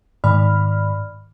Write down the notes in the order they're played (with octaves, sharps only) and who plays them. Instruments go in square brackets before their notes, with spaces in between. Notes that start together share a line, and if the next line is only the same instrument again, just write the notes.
[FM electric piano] G#2 D#3 D5 B5 F6